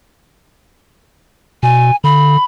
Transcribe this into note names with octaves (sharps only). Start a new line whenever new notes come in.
B2 G#5
D3 B5